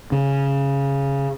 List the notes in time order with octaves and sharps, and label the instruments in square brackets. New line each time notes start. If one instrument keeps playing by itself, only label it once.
[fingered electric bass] C#3